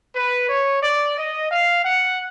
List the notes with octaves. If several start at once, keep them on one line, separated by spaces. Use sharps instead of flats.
B4
C#5
D5
D#5
F5
F#5